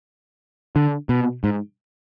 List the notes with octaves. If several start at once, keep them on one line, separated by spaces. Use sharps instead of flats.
D3
B2
G#2